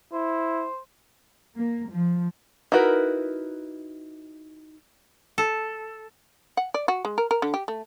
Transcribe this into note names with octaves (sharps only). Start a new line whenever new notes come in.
E4 C5
A#3
F3
D#4 E4 F#4 A#4 B4
A4
F#5
D5
F#4
G#3
A#4
A#4
D3
G4
A3